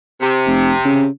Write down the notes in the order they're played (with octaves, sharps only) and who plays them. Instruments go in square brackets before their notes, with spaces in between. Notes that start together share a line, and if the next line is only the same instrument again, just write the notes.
[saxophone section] C3
[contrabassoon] F1
C#3